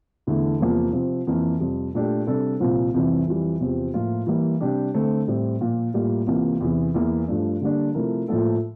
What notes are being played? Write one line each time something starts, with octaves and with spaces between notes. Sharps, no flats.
E2 D3 A3 E4
E2 C3 F3 A#3
C3 F3 C4
F2 E3 A#3
F2 C3 G3
A#2 A3 D4 G4
C3 G3 D4 A4
C2 A#2 F3 C4
F2 C3 E3 G3
F2 E3 G3
E2 C3 F3 C4 G4
A2 F3 A#3 F4
E3 G3 A#3
C3 G3 D4 G4
D3 A3 C4
A2 G3 C4
A#2 F3 A#3
A2 G3 A#3 F4
C2 C3 E3 A#3 F4
E2 C3 E3
E2 E3 A#3
G2 F3 A3 D4
D3 G3 A#3 D4
C3 F3 A3 E4 A#4
A2 F3 A#3 F4 A4